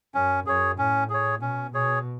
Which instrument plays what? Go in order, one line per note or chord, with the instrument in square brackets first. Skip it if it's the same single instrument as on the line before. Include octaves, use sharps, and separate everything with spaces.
[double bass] F#2 [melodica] C#4
[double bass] F#2 [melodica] G#4 C#5
[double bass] A2 [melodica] C#4
[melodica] G#4 C#5
[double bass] B2 [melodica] C#4
[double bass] B2 [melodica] G#4 C#5